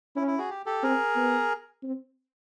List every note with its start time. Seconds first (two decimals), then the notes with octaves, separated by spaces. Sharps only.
0.16 C#4 E4
0.27 E4
0.38 F#4 G#4
0.50 G4
0.66 G4 A4
0.83 C4 G#4 A#4
1.16 B3
1.83 C4